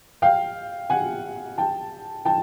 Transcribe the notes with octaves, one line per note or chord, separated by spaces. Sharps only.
F5 G5
F#5 G#5
G5 A5
G5 A5